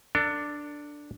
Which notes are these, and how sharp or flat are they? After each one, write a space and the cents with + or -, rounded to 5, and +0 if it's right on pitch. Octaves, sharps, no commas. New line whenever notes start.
D4 +0 A4 +35